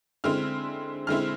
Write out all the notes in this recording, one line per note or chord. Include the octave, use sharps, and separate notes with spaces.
D3 G#3 C4 E4 F6
D3 G#3 C4 E4 F6